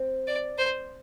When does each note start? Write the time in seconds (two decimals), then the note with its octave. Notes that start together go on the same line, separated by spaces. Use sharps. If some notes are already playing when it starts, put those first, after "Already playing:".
Already playing: C4
0.27 D5
0.58 C5